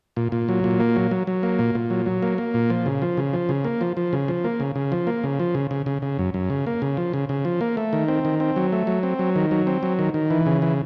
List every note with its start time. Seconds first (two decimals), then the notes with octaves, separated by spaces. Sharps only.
0.17 A#2
0.32 A#2
0.49 F#3
0.64 A#2
0.80 A#3
0.96 F#3
1.11 F#3
1.27 F#3
1.43 A#3
1.59 A#2
1.75 A#2
1.90 F#3
2.06 F#3
2.22 A#3
2.38 A#3
2.54 A#2
2.70 F3
2.86 C#3
3.02 F3
3.17 C#3
3.33 F3
3.49 C#3
3.64 A#3
3.81 F3
3.97 F3
4.13 C#3
4.28 F3
4.44 A#3
4.60 C#3
4.76 C#3
4.92 F3
5.07 A#3
5.24 C#3
5.40 F3
5.55 C#3
5.71 C#3
5.86 C#3
6.02 C#3
6.19 F#2
6.34 F#2
6.50 C#3
6.66 A#3
6.82 C#3
6.97 F3
7.14 C#3
7.29 C#3
7.45 F3
7.61 A#3
7.77 A3
7.93 D#3
8.08 C4
8.25 D#3
8.40 C4
8.56 F#3
8.72 A3
8.87 F#3
9.03 C4
9.19 F#3
9.36 D#3
9.51 F#3
9.67 C4
9.83 F#3
9.99 D#3
10.14 D#3
10.30 E3
10.46 C#3
10.62 E3